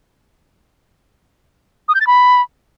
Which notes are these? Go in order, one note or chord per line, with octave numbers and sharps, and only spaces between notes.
D#6
G6
A6
B5